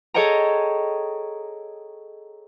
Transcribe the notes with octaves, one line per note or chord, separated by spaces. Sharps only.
G#4 A4 C#5 D#5 G5 A#5